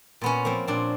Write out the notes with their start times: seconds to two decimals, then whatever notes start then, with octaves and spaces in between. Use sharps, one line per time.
0.21 A#2 B3 C#4
0.45 F3 A#3 C4
0.68 A#2 C4 D4